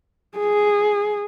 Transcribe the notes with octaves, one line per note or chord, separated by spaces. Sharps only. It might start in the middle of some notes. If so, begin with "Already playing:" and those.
G#4